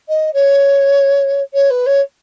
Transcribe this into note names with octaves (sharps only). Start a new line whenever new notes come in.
D#5
C#5
C#5
B4
C#5